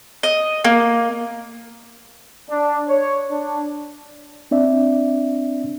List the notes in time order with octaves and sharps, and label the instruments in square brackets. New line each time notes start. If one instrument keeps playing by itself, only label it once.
[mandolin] D#5
A#3
[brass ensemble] D4
C#5
D4
[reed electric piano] C4 D4 D5 E5